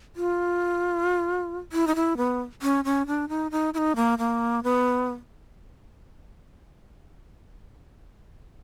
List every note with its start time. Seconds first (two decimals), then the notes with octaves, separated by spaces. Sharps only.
0.16 F4
1.73 E4
1.87 D#4
1.95 E4
2.17 B3
2.62 C#4
2.85 C#4
3.07 D4
3.29 D#4
3.51 D#4
3.74 E4
3.78 D#4
3.96 A#3
4.19 A#3
4.63 B3